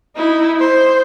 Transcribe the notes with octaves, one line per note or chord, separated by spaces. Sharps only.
D#4 E4
C5